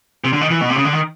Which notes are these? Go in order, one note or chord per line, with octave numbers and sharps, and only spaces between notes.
C3
D3
D#3
E3
B2
C3
C#3
D3
D#3